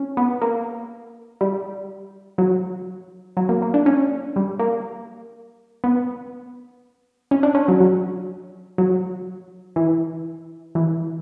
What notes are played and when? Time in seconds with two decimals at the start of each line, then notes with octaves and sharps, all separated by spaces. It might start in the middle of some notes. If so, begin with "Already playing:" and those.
Already playing: C#4
0.17 B3
0.42 A#3
1.41 G3
2.38 F#3
3.37 F#3
3.49 A#3
3.62 A#3
3.74 D4
3.86 C#4
4.36 G3
4.59 A#3
5.84 B3
7.31 C#4
7.43 D4
7.55 C#4
7.68 F#3
7.81 F#3
8.78 F#3
9.76 E3
10.75 E3